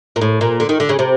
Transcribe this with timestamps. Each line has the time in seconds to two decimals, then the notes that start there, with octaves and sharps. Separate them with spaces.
0.16 A#2
0.21 A2
0.41 A#2
0.60 D3
0.69 D#3
0.80 D3
0.89 C#3
0.99 C3